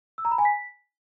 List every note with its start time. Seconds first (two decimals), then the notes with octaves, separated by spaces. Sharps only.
0.18 E6
0.25 A#5
0.32 B5
0.38 G#5
0.45 B6